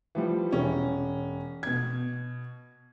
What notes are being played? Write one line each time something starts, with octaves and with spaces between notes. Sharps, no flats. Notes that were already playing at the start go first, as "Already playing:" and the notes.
E3 F3 G3
E1 C#4
B2 G#6